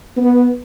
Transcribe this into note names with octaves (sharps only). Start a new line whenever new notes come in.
B3